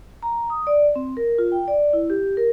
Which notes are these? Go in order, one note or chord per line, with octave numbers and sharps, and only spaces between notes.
A#5
D#6
D5
C4
A#4
F4
G5
D5
E4
G4
A#4